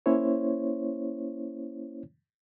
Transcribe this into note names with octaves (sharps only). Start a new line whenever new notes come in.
A#3 C#4 E4 C5 C#5